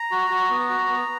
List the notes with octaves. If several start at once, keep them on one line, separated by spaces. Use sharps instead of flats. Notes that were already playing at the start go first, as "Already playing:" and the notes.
Already playing: A#5
F#4
F#4
B3
F#4
B3